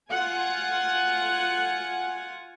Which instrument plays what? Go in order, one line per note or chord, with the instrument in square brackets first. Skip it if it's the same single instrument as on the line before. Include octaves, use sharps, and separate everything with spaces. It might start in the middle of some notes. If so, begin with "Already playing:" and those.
[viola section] F4 F#5 G#5